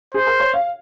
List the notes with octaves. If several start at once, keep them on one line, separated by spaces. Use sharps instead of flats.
G#4 C5
A#4
C#5
F5